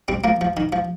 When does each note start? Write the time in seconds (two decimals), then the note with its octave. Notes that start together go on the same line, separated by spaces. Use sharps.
0.08 G3 C4
0.24 F3 A#3
0.41 F3
0.57 D#3
0.72 F3